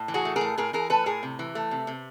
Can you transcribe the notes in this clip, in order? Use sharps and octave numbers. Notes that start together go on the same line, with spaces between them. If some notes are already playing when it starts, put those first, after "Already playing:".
Already playing: A2
E3
F#4 G#4
A3
G#4 A#4
A2
A2 G#4 A#4
E3 G#4 A#4
A3 A4 B4
A2 G#4 A#4
C3
E3
A3
C3
C3